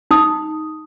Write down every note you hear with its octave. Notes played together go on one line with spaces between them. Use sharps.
D#4 D#6